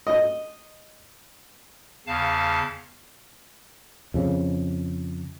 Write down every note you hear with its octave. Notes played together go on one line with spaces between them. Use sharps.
D#5
E2 C#3 F5 A5
F2 C#3